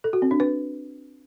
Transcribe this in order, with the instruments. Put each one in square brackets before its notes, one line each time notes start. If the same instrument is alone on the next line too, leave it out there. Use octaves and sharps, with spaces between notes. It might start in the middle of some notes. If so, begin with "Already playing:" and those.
[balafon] A4
F#4
C4
D4
B4